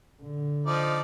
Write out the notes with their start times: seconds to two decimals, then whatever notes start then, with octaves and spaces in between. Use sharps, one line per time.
0.22 D3
0.67 F3 D#4 D5